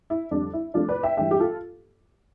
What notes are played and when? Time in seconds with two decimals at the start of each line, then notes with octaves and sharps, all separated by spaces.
0.10 E4
0.31 F2 D3 G3 D4
0.53 E4
0.74 C2 C3 F3 A3 D4 F4
0.89 B4 D5
1.03 E5 G5
1.17 G2 E3 G3 E5 G5
1.31 G4
1.40 F4 A4